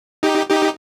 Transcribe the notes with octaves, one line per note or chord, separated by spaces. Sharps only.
D#4 G4
D#4 G4